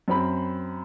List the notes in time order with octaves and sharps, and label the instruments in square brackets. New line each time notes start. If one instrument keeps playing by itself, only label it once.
[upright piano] F#2 C4 B5